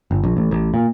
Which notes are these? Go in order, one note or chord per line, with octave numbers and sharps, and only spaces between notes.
G1
A#1
A1
A1
A#2